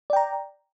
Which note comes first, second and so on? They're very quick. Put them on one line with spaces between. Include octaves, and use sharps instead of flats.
D5 G5 A#5